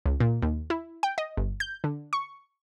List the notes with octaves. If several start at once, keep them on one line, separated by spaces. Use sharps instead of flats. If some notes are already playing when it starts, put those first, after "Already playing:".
C#2
A#2
D#2
E4
G5
D#5
G1
G6
D3
C#6